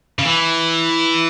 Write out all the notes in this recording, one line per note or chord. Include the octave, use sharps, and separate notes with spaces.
C#3
E3